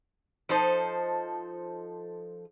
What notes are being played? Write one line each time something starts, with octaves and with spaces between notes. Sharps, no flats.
F3 D#4 A4 C5